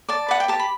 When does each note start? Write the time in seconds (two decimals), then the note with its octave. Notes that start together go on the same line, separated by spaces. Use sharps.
0.09 D5 A5
0.28 B4 F#5
0.40 G5
0.48 G4 A5
0.59 B5